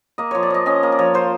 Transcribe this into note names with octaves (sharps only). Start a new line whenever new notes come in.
A#3 D#5
F3 C#5
D5
F3 D#5
C#4 D#5
A#3
D5
F3 C#5
F3 C5